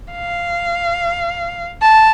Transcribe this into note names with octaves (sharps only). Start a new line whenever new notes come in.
F5
A5